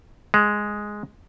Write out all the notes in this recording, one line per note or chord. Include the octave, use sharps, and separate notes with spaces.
G#3